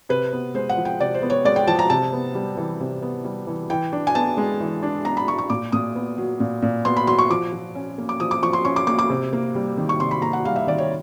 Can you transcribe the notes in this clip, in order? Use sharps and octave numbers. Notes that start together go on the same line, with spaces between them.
C3 B4
B3
G#3 C5
F#5
F3
G5
C3 D5
C5
B3
C#5
G#3 D5
G5
F3 A5
A#5
C3 A5
B3
G3
E3
C3
B3
G3
E3
E3 G5
D4
G#5
B3 A5
G#3
E3
D4
B3 A#5
B5
G#3 C#6
C#6
A#2 D6
A#2 D#6
B3
F#3
A#2
A#2
B3 C6
B5
F#3 C6
C#6
F3 D6
F3
C#4
A#3
D6
F3 D#6
D6
F3 C#6
C6
C#4 C#6
D6
A#3 D6
D6
C3
A#3
G3
D#3
C#6
C3 C6
B5
A#3 A#5
F#5
G3 F5
E5
D#3 D5
C#5